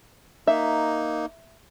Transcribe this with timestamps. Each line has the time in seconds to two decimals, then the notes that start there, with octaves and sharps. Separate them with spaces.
0.47 A#3 D#4 E5